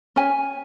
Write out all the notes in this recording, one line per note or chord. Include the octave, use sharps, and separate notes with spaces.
C#4 G#5